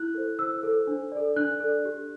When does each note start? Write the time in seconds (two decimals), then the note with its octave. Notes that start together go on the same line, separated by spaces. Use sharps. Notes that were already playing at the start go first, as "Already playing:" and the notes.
Already playing: E4 F#6
0.14 A4 C5
0.39 E4 E6
0.63 A4 C5
0.87 D4
1.12 A4 D5
1.36 D4 F#6
1.60 A4 D5
1.85 G4